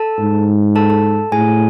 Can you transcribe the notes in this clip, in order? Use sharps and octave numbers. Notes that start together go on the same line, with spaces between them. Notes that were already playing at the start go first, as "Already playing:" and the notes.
Already playing: A4 A5
G#2
A4 A5
A4 A5
A2 G#4 G#5